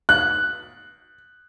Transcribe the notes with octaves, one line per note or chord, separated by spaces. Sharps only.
F#6